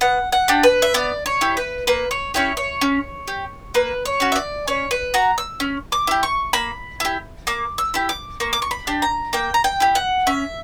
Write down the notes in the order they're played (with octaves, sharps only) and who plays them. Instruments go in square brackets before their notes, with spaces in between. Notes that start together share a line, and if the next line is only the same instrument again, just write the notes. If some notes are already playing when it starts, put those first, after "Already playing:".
[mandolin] B3 F#5
F#5
D4 G4
B4
E5
B3 D5
C#5
E4 G4
B4
A#3 B4
C#5
C#4 E4 G4 C#5
C#5
C#4
G4
A#3 B4
C#5
C#4 F#4
E5
D5
C#4 C#5
B4
F#4 A#5
E6
C#4
D6
E4 G4
C#6
A#3 B5
E4 G4
A#3 D6
E6
E4 G4
D6
A#3 C#6
D6
C#6
B5
D4 G4
A#5
A#3 G5
A#5
G5
E4 G4
F#5
C#4 E5